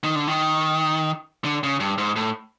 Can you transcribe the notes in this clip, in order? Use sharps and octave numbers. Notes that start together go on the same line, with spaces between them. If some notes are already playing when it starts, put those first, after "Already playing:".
D#3
D3
D#3
D3
C#3
G2
G#2
A2